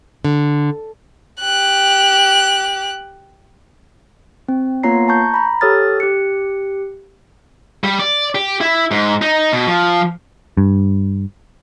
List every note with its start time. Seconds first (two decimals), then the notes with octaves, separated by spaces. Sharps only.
0.25 D3
1.41 G4 F#6
4.48 C4
4.83 A#3 B3 F4 C#5 A#5 C7
5.08 A5 A#5 C#6 G6
5.34 A#5 B5
5.61 G4 A4 C#5 D#6 F6 A6
6.00 G4 F#6 C#7
7.84 G3
7.99 D5
8.35 G4
8.61 E4
8.91 G#2
9.22 D#4
9.53 B2
9.67 F3
10.57 G2